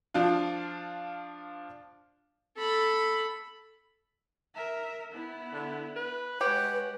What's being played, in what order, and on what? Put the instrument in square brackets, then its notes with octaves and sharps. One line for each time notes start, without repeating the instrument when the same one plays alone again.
[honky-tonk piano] F3 D4 F4
[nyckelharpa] A4 B5
[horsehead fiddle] A#4 E5
B3 E4
[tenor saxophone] D3
B4
[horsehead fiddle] G#3 F#5 [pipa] G4 [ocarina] B4 [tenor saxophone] C#5